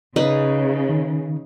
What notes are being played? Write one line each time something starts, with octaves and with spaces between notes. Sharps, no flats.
C#3 D#4 B4
D#3